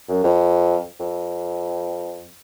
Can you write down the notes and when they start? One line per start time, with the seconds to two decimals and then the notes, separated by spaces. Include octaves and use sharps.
0.09 F#2
0.24 F2
1.00 F2